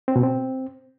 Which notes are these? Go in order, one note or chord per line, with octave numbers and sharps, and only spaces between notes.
C4
B2
C4